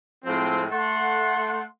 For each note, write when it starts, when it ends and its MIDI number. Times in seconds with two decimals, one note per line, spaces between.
0.25 0.64 45
0.25 0.64 53
0.25 0.64 56
0.25 0.64 60
0.71 1.62 57
0.71 1.62 78
0.71 1.62 84